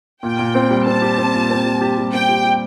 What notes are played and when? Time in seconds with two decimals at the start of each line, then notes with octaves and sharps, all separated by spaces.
0.23 A#2 G5
0.39 A#2
0.55 C4
0.71 G3
0.86 C4 A5
1.02 G4
1.18 C4
1.34 A#2
1.50 C4
1.66 G3
1.81 G4
1.98 G3
2.13 C4 G5
2.29 G4
2.45 G3